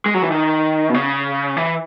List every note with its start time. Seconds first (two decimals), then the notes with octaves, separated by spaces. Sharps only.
0.06 G#3
0.14 F#3
0.23 E3
0.31 D#3
0.90 B2
0.94 C#3
1.57 E3